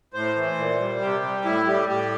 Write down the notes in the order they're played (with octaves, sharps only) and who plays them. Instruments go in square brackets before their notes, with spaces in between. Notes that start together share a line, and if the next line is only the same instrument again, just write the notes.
[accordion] A2 C5
E3
A#2
G3
C3 G4
G3
A2 E4
G3 G4
A2 G4